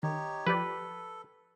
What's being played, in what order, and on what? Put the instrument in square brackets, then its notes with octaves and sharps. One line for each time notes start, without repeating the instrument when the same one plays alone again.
[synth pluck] D#3 [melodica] D#4 G4 C#5
[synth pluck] F3 G4 D5 [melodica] A4 [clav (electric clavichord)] B4